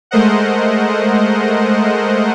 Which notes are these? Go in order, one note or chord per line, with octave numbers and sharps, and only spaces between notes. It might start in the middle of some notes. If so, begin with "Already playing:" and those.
G#3 A3 A#4 C5 D#5 F#5